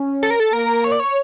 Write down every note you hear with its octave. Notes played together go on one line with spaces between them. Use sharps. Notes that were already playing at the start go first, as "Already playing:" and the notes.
Already playing: C#4
A4
A#4
A4
A#3 A#4
C#5
D5
C#5